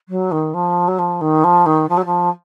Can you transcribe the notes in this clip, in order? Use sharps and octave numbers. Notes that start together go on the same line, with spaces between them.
F#3
D#3
F3
F#3
F3
D#3
F3
D#3
F3
F#3
F3